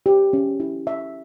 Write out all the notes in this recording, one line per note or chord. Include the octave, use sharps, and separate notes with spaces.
G4
C#4
E4
E5